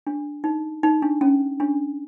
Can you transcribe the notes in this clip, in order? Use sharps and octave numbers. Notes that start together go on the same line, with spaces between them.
D4
D#4
D#4
D4
C#4
D4